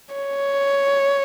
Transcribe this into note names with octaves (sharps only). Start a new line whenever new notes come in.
C#5